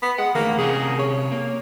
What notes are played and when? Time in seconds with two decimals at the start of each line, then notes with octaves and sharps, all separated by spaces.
0.02 B3
0.18 G#3 F#5
0.35 D#3 E3 A3 A#3
0.58 C3 C#4 G#4 A#4
0.99 C#5
1.32 A#3